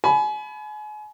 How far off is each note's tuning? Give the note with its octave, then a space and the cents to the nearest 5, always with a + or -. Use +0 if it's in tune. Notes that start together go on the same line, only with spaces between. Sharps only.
G#5 +35 B5 +5